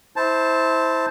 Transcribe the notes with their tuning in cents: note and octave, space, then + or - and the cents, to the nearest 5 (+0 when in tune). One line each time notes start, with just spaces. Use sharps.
E4 -25 C5 +0 A5 +0